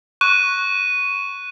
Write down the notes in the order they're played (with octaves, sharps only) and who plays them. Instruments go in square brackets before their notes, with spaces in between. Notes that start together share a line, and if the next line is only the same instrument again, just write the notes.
[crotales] C#6 F#6 D#7